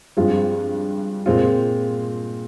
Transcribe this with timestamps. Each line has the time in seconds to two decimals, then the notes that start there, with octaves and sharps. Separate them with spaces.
0.17 G2 F3 G#3 C4 F4
1.26 A#2 G#3 C4 F4